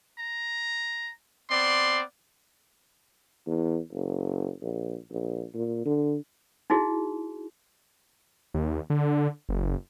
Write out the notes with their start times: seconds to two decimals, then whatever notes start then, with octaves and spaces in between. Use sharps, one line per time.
0.19 A#5
1.50 B3 C4 D5 C6
3.47 E2
3.92 F#1
4.61 A#1
5.11 A#1
5.54 A#2
5.85 D3
6.70 D#4 E4 F#4 G#4
8.54 D#2
8.90 D3
9.49 F#1